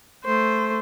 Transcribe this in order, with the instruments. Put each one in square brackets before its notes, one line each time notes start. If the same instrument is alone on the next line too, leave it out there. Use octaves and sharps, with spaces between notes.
[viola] A3 C5